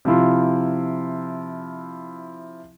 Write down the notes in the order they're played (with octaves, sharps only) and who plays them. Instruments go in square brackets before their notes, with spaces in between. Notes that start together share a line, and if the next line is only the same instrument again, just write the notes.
[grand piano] C3 F3 E4 F4